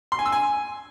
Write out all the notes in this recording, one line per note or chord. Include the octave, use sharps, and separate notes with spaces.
C6
G#5
E6
G#5